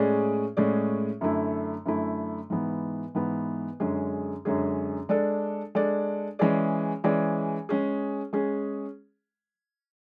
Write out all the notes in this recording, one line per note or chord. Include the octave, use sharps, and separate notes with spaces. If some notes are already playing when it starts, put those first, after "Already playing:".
Already playing: A2 G#3 C#4 G#4 D5
A2 G#3 C#4 G#4 D5
F#2 D3 A3 E4
F#2 D3 A3 E4
G#2 E3 B3
G#2 E3 B3
F#2 D3 G#3 C#4 G#4
F#2 D3 G#3 C#4 G#4
G#3 D4 A4 D5
G#3 D4 A4 D5
E3 G#3 C#4 G#4 D5
E3 G#3 C#4 G#4 D5
G#3 C#4 G#4
G#3 C#4 G#4